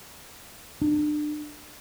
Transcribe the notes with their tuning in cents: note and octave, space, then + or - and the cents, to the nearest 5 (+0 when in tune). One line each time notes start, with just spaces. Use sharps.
D4 +35